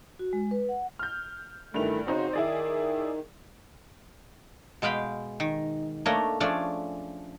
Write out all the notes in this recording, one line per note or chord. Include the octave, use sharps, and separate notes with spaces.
F#4
G#3
B4
F#5
F6 G6
G2 D#3 E3 A3 F7
C#3 C4 D#4 F#4 C5
D#3 E4 G#4 D5
B2 G#3 F5 G5 B5
D#3
A3 A#3 D4 A#4 C#5 D#5
F3 A3 C#4 D4 G#4 D5